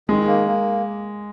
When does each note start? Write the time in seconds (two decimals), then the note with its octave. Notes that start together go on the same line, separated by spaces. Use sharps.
0.09 D#3 G#3
0.27 A#3
0.47 A#3